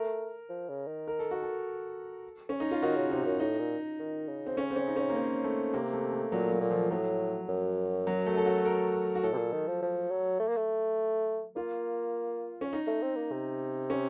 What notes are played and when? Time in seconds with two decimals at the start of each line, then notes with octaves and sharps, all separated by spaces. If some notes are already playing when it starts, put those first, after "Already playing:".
Already playing: A3 A#4
0.49 F3
0.69 C#3
0.87 D#3
1.08 A#4
1.19 A4
1.31 F#4
1.43 A4
2.49 C#4
2.60 D#4
2.71 F4
2.82 D#3 F#4
2.97 C#3
3.11 C3 D#4
3.26 F#2
3.40 A2 D#4
3.59 A#2
3.99 D#3
4.29 C#3
4.46 C4
4.57 C#4
4.70 C4
4.76 C#4
4.87 D#4
4.96 C#4
5.10 A#3
5.16 C4
5.44 A3
5.74 C3 A#3
5.93 A3
6.12 A3
6.32 A#2 F#3
6.52 F#3
6.61 A#2
6.71 F3
6.91 A2 F#3
7.49 F#2
8.07 F#3
8.26 A3
8.37 A4
8.46 F#4
8.65 A#4
9.15 F#4
9.23 A2 A4
9.34 C3
9.38 A#2
9.53 D#3
9.68 F3
9.82 F3
10.10 F#3
10.39 A3
10.48 A#3
10.57 A3
11.56 A#3 F4
12.61 C#4
12.73 D#4
12.87 A3
13.02 C4
13.16 A#3
13.32 C3
13.90 C#4